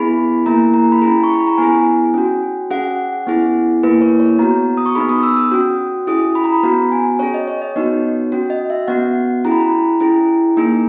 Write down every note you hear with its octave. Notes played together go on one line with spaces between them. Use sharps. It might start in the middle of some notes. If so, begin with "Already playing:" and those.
Already playing: B3 E4 G#4 B5
A#3 E4 G#4 A#5
A#5
B5
C#4 E4 G#4 A#5
C#6
B5
A#5
B3 E4 G#4 G#5
C#4 F#4
C#4 G#4 F#5
B3 E4 G#4
A#3 E4 G#4 B4
C#5
C#5
B3 F#4 A#5
D#6
C#6
B3 D#4 G#4 B5
D#6
E6
D#6
C#4 F#4
C#4 E4 G#4 D#6
B5
A#5
B5
B3 F#4 A#5
G#5
C#4 G#4 C#5
D#5
C#5
D#5
B3 D#4 F#4 C#5
C#4 F#4
D#5
E5
B3 F#4 F#5
C#4 E4 G#4 A#5
B5
A#5
C#4 E4 G#4
A#3 D#4 G#4